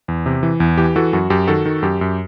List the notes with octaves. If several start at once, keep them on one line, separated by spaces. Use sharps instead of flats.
E2
C3
E3
E2
E3 G4
E3 F#4 A4
F#2 F#4
F#2 G4
D#3 F#4 A4
D#3
F#2 G4
F#2